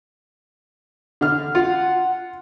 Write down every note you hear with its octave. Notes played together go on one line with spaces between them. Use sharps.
D3 F6
F4 F#5